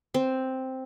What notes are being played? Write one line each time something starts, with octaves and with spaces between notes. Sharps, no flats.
C4